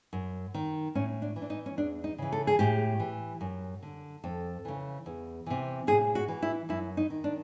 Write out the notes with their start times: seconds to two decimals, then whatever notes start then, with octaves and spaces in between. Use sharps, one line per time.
0.13 F#2
0.54 D#3
0.95 A2 C#4
1.22 D4
1.36 E3
1.42 D4
1.50 D#4
1.66 C#4
1.77 E2 D4
2.04 D#4
2.18 C#3 E3
2.32 A4
2.47 G#4
2.59 A2 G4
3.00 E3
3.41 F#2
3.83 D3
4.24 F2 A4
4.65 C#3 E3
5.06 E2
5.46 C3 E3
5.87 A2 G#4
6.15 F#4
6.28 E3
6.42 E4
6.69 F#2 E4
6.97 D#4
7.10 D#3
7.24 D4